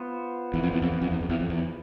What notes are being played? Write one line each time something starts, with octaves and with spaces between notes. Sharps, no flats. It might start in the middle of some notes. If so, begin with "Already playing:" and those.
Already playing: B3 F4 C5
E2
F2
E2
F2
E2
F2
E2
F2
E2
F2
E2